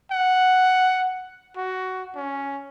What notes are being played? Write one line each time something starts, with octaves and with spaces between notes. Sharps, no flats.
F#5
F#4
C#4